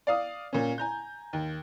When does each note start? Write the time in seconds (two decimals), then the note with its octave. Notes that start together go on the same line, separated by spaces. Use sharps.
0.07 D5 F5 D#6
0.53 A#2 C#4
0.78 G#5 A#5 G6
1.33 D#2